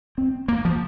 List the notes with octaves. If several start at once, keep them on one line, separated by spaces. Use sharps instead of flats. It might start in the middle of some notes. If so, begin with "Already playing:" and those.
C4
A#3
F3